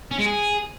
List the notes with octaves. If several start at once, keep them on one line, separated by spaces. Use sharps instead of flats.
C#4
G#3
G#4